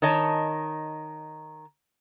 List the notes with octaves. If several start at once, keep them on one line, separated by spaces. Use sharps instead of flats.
D#3 C#5 D#5 A5